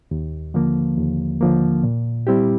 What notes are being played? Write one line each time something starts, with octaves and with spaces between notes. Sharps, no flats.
D#2
D3 F3 A#3
D#2
D3 F3 A#3
A#2
G3 C4 E4 G4